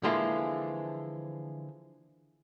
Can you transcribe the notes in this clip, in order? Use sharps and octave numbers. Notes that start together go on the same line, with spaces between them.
D3 E3 F3 G#3 A#3 E4